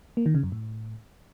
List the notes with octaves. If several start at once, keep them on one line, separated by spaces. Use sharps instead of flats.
A#3
D#3
C#3
F#2
A2